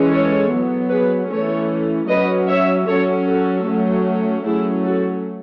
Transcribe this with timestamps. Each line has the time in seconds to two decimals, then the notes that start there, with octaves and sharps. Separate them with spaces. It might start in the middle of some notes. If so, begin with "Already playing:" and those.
Already playing: E3 G#3 C#4
0.11 A4 C#5
0.51 F#3 B3
0.90 G#4 B4
1.29 E3 A3 C#4 A4 C#5
2.08 F#3 C#4 B4 D#5
2.48 C#5 E5
2.87 F#3 C#4 A4 C#5
3.27 F#4 A4
3.67 F#3 A3 C#4
4.45 F#3 A3 C#4 E4 G#4
4.84 F#4 A4